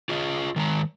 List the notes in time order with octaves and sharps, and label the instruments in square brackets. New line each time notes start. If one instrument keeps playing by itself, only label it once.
[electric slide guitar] F4 G#4 D#5
D#3 G#3 A#5